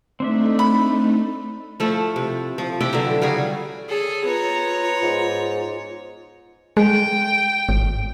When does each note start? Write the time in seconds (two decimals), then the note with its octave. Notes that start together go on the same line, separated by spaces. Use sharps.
0.20 A3 C4 D4 D#4 E5
0.59 B5
1.80 F3 A3 E4
2.16 C3
2.58 F3
2.81 C3 E4 G4 G5
2.93 D3 E3 F#3
3.22 C#3 G3 F#4 G#4
3.89 G#4 A4 C#5
4.25 B3 F4 C#5 A#5
5.03 G#2
6.77 G#3 G5
7.69 G#1